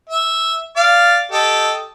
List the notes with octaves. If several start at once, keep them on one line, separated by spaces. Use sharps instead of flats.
E5
D5 F5
G4 A4 D#5